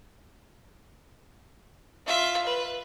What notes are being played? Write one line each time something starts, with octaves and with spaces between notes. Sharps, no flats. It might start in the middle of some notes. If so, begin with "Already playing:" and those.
F4 E5
B4